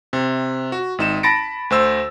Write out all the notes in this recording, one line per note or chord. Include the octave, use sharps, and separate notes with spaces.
C3
F#4
G#1 D#4 E7
A5 B5 A6 A#6 C#7 D7
D2 C5 E6